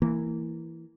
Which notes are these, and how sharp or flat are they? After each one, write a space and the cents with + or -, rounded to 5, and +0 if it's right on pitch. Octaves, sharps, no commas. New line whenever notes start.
E3 +0 A#3 -20